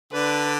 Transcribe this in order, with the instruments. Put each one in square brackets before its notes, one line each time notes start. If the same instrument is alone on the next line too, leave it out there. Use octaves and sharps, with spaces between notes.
[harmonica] D3 D4 [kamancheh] B4